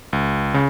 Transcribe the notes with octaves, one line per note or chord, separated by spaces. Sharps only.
C#2
C#3